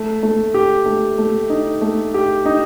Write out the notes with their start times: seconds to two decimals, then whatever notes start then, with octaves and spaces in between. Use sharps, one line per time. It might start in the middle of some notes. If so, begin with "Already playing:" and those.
Already playing: A3
0.23 A3
0.54 G4
0.86 A3
1.18 A3
1.50 D#4
1.81 A3
2.14 G4
2.46 D#4